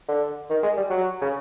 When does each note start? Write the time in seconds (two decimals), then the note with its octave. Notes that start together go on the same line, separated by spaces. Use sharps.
0.08 D3
0.50 D#3
0.63 G#3
0.77 G3
0.90 F#3
1.21 C#3